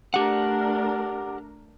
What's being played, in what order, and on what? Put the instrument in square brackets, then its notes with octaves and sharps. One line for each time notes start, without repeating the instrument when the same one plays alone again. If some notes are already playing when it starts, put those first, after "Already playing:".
[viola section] A3 D4 A#4 [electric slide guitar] G4 F#5